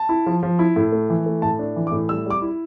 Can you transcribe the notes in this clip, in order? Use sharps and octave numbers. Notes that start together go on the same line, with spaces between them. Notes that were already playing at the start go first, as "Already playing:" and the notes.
Already playing: A5
E4
F3
F3
E4
A2
A3
E3
A3
A2 A5
D4
E3
D6
A2
G3 E6
G3 D6
E4